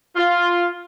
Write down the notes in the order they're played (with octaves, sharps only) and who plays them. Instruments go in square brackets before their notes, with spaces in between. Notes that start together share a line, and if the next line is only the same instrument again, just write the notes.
[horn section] F4